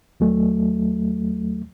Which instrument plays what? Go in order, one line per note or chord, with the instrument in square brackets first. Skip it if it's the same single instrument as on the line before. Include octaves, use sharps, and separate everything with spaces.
[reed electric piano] D#2 F#3 A3